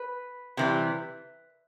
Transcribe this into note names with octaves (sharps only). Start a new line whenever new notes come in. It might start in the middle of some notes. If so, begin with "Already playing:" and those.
Already playing: B4
C3 E3 G3